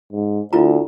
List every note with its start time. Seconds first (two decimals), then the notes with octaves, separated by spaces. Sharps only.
0.12 G#2
0.53 D2 E4 F4 A#5